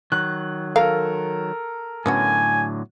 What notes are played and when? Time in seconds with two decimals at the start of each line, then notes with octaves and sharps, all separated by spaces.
0.12 D#3 F#3 F#6
0.76 A4 A#4 F5
2.06 A2 D3 F#3 B3 C#4 F#4 G#5